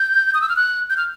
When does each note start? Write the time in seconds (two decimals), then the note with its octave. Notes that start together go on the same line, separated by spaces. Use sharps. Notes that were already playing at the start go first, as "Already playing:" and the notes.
Already playing: G6
0.34 D#6
0.41 E6
0.49 F6
0.56 F#6
0.90 G6
0.97 F6